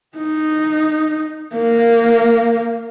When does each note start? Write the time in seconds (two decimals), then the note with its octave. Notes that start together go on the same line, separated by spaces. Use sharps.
0.18 D#4
1.54 A#3